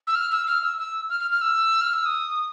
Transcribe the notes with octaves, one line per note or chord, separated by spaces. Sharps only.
E6
F6
E6
F6
E6
E6
F6
F6
F6
E6
F6
E6
D#6